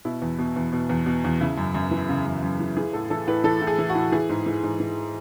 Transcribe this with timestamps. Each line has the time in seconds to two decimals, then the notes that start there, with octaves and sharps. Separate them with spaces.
0.05 B2 E4
0.22 E2
0.39 B2
0.56 E2
0.73 B2
0.89 E2
1.06 B2
1.24 E2
1.41 C#3 E4
1.58 F#2
1.75 F#2
1.91 E3
2.09 C#3
2.26 F#2
2.42 F#2
2.60 E3
2.77 E3 G#4
2.93 A2 A4
3.10 E3 A4
3.27 A2 B4
3.44 E3 A4
3.61 A2
3.67 G#4
3.78 E3
3.89 F#4
3.95 A2
4.12 E3 G#4
4.29 G#2
4.46 E3
4.63 G#2
4.80 E3